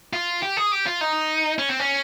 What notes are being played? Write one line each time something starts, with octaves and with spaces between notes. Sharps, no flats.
F4
G4
G#4
G4
F4
D#4
C#4
C4
C#4